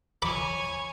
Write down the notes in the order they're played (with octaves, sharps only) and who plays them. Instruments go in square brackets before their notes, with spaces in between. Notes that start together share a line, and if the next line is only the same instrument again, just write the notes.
[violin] C#5 G#5 [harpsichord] B5 D6